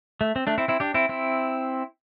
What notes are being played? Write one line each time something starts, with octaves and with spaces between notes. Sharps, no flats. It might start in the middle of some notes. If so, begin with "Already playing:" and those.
A3
C4
A3 D4
C4 E4
C4 E4
D4 G4
C4 E4
C4 E4